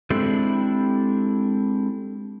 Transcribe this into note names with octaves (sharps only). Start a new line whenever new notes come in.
G#3 C4 D4 E4 G4 A4